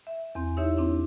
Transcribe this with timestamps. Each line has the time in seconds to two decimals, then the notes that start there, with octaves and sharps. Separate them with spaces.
0.07 E5
0.35 E2 C4
0.57 D#4 E4 G4 C#5 E5
0.78 C4 D4 E4